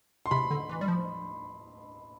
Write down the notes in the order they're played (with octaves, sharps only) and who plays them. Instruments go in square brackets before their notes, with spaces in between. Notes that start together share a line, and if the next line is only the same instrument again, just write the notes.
[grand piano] C6
[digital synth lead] C3 [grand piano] B5
[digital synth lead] D3
E3
G3
F3